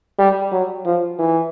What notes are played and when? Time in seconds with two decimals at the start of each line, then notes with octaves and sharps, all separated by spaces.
0.19 G3
0.52 F#3
0.85 F3
1.19 E3